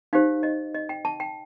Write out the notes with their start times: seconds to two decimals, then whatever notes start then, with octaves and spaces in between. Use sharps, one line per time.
0.13 D#4 G4 C5 F5
0.43 D#5
0.74 D#5
0.89 G5
1.05 A5
1.20 G5